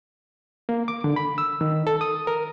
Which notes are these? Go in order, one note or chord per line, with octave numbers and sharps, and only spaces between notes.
A#3
D6
D3
B5
E6
D#3
A4
D#6
A#4